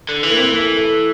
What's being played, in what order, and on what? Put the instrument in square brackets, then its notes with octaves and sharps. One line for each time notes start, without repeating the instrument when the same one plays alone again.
[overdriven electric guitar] D3
E3
[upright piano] A#3
C4
A#3
A3
A3